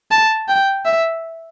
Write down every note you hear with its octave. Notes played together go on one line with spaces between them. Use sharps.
A5
G5
E5